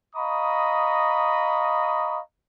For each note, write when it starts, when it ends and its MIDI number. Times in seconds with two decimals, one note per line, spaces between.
0.16 2.20 75
0.16 2.20 77
0.16 2.20 82
0.16 2.20 83
0.16 2.20 85
0.16 2.20 87